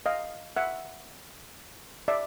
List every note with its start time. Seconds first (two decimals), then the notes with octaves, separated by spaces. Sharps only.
0.06 D#5 F5
0.56 E5 F#5
2.08 D5 E5